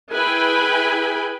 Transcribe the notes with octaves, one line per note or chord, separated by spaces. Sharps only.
E4 G#4 B4 G5 G#5 B5